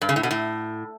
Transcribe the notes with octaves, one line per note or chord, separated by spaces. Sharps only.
G2
C#3
A2
B2
A2